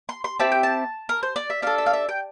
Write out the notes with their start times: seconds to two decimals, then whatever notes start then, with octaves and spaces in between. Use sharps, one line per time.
0.09 C6
0.24 C6
0.39 C4 E4 G4 A5
0.52 G5
0.63 A5
1.09 A#4
1.23 C5
1.36 D5
1.50 E5
1.62 D4 A4 F5
1.78 E5
1.86 F5
1.93 E5
2.09 G5